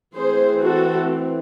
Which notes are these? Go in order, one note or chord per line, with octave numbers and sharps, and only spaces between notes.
E3 A3 C4 G#4 C5
F#4 A4